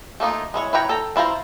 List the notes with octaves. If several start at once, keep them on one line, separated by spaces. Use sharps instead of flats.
A3 A#3 D#4 F4
G#3 E4 C#5
E4 B4 C#5 G5 A#5
A4 G5 A#5
D4 E4 F4 C5 A#5